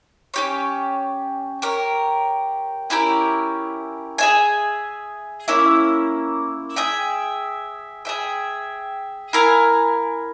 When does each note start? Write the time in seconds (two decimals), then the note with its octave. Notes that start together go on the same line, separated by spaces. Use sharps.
0.34 C#4 G4 C#5
1.62 G4 A#4 C#5
2.90 C#4 E4 G4 A#4
4.18 G#4 E5 G#5
5.48 A#3 C#4 E4
6.76 G#4 E5 G5
8.05 G#4 E5 G5
9.33 E4 A#4 F5 G#5